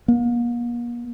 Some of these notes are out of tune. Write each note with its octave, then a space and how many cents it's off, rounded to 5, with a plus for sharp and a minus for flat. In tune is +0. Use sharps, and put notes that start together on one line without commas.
A#3 +40